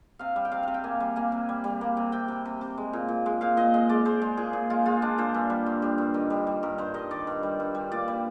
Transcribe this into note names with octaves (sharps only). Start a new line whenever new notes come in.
C3 F5
G3
G5
C3 F5
C3 F5
G5
A#3 G#5
G3
A#3 G#5
C3
G3
G3
A#3
C3
C3 G5
C3
C3
C3
G#3
A#2
A#2
G#3
A#2 F5
A#2 D#5
G#3 D#5
G#3 D5
G#3 C5
G#3
A#2 G#4
A#2
G#3 F4
G#3 F4
G#3 D4
A#2 C5
G2
G3
G2
G3
G2
D#3
G3
G3
G2 A#4
G2 C5
D#3 D#5
D#3 D5
G2
G3
G2
G3
A#2 D5
G3